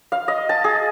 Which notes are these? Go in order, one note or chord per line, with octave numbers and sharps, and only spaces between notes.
F5
D#5
A5
G#4